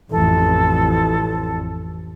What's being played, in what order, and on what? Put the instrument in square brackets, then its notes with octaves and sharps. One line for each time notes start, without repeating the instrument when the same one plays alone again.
[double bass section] A1 F2 [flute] A4